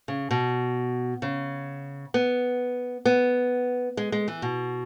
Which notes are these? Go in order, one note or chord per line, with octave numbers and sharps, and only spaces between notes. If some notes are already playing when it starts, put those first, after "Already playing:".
C#3
B2
C#3
B3
B3
G#3
G#3
E3
B2